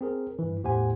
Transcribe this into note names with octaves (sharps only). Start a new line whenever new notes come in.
C4 G#4 A#4
G2 E3
E2 A2 G4 C5 F#5 G#5